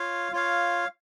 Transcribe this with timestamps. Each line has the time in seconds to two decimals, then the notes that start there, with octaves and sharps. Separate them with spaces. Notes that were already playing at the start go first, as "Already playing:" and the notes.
Already playing: F4 C#5 F5
0.32 F4 C#5 F5